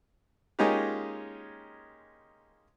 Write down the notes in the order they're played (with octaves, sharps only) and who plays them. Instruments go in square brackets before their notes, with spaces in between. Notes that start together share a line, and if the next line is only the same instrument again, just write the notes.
[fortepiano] G#3 A#3 C#4 D#4 F4 G4